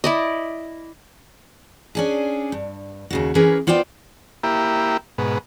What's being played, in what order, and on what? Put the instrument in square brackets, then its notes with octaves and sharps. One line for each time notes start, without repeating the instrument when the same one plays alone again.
[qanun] E4 D5 D#5
[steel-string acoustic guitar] C#4 D4 G#4
G2
D#2 C#3 F#4
E3 C#4 G#4 A#4 B4
B3 F4 C5 D5 G5
[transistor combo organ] A#3 E4 G4
G#2 B2